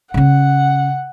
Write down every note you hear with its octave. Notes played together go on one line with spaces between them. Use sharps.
C#3 C#4 F#5